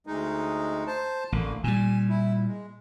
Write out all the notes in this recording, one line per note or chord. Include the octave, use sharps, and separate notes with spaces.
D2 G#3 D#4
C5 A5
A1 D3 A#3
A#2 G3 G#5
E4
G#3